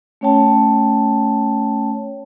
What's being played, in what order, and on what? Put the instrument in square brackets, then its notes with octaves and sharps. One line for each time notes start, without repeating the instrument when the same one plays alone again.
[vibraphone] A3 C#4 C#5 G5 A5